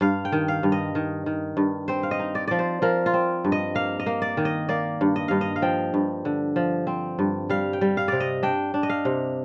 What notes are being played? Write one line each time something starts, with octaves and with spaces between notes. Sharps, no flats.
G2 F5
G5
D#3
F5
G2
D#5
D#3
D#3
G2
C4 C5
F5
D#5
D#4
D5
F3 D5
C5
F3 A#4
F4
C4
G2
D#5
A#3 F5
D#5
A#3
D5
D#3
D#5
A#3 D5
G2
D#5
G2 F5
D#5
F5
F3 G5
G2
D3
F3
C4
G2
G3 F5
G5
G3
F5
C3 D5
D#5
D4 G5
D4
D#5
F5
C3